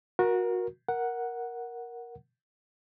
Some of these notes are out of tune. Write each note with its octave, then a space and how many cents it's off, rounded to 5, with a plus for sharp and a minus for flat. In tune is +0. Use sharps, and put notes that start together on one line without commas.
F#4 -20 A#4 +20
A#4 +10 F#5 +0